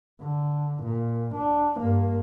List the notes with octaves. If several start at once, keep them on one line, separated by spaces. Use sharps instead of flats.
D3
A#2
D4
G2 A#3